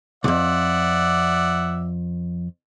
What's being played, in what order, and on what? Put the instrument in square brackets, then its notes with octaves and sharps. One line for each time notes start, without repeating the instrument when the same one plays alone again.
[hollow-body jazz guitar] C2 F2 [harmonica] D5 E5 F#5